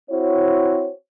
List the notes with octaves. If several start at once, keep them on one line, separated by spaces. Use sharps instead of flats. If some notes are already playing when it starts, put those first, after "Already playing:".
C4 E4 F#4 C5 C#5